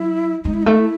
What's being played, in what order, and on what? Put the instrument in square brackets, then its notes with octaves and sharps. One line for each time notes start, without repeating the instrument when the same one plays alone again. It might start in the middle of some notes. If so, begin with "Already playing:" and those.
Already playing: [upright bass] F#3 [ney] E4
[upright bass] G#3 [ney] D#4
[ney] E4
[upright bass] A3 [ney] D#4
[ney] E4